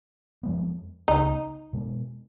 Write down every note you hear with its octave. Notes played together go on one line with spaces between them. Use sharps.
F2 F3 G#3 B3
C#2 C#3 G#3 B3 D#4
B2 G#3 B3